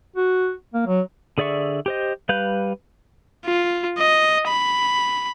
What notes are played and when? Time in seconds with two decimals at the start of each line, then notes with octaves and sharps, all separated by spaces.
0.16 F#4
0.74 A#3
0.86 F#3
1.38 D3 G#4 D5 E5 C#6
1.86 G4 C5 D#5
2.29 G3 B4 F5 F#6 G6
3.45 F4
3.98 D#5
4.48 B5